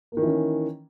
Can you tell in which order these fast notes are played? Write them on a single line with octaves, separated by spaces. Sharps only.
A#3 D#3 E3 C#4